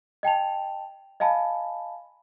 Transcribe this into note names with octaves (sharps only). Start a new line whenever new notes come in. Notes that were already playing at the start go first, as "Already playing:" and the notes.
D#5 G5 A5 F7
D#5 F5 G#5 A5 B5